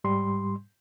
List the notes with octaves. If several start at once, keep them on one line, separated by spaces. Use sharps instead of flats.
G#2 G3 C6